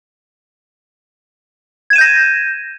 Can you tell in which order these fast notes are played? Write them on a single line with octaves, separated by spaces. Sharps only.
G#6 E7 D#7 G6 A#6